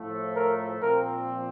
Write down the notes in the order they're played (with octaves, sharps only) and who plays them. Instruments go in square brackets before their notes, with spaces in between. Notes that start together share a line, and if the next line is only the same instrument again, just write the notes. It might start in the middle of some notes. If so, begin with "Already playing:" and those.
Already playing: [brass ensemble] A2 F3 A3
[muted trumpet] A#4
[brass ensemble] A#2 F3 C4 [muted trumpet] A#4